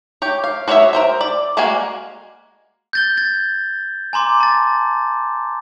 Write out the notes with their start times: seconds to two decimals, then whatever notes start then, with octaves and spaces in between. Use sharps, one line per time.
0.22 G4 C#5
0.44 F5
0.68 F#4 C5 C#5 D#5 E5
0.93 A#4 C5 E5
1.21 D5
1.57 G3 G#3 A#3 F#4 G#5
2.93 G6 A6 G7
3.17 G#6 A6
4.13 G#5 A#5 C6 D6
4.40 A5 A6